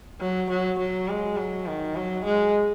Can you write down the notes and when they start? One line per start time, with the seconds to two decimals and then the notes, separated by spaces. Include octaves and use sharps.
0.21 F#3
0.50 F#3
0.79 F#3
1.08 G#3
1.37 F#3
1.67 D#3
1.96 F#3
2.25 G#3